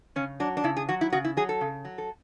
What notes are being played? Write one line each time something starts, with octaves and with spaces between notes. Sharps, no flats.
C#3 C#4
F#3 D4
D4
C#3 E4
G#4
F#3 F#4
E4
C#3 F#4
E4
F#3 G#4
A4
C#3
F#3
A4